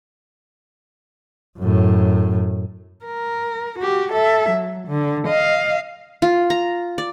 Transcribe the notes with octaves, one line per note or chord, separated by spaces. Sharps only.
F#2 A2
A#4
F#4 G4
A4 E5
F#3
D3
D#5 F5
F4
A#5
D5